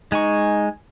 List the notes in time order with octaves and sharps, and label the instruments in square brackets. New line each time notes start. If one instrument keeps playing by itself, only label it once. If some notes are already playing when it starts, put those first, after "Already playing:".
[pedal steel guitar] G#3 G#5 C#6 [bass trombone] D#4